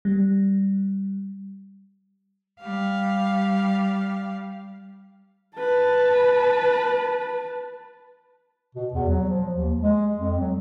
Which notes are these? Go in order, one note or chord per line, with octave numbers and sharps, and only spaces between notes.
G3
G3 F5
B4 A5
B2
E2
F#3
F3
D#2
G#3
F2
F#3